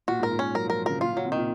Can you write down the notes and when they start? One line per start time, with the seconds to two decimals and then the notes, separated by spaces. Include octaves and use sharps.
0.08 A#2 F#4
0.19 G#2 A#4
0.31 A#2
0.39 C#4
0.55 F#3 A#4
0.66 F3 A#4
0.86 C#3 A#4
1.01 A#2 F4
1.13 A#2 F#3
1.25 C3
1.32 A#2 D#3